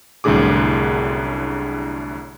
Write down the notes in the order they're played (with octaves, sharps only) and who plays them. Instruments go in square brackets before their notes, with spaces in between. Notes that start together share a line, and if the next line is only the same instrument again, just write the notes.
[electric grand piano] C2 F#2 A2 D3 G#4 D6